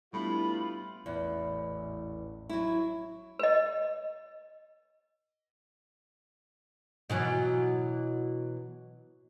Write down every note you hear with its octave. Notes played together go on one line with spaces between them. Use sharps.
A2 G3 B3 D4 E4 F4 B5
A1 E2
F#3 E4
B4 D#5
B2 E3 F#3